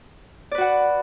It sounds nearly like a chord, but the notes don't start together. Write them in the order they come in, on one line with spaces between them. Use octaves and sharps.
D5 B4 F#4 F#5